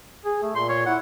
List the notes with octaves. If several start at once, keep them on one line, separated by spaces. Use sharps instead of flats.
G#4
A3
A#2 C6
C#5
E4 F#5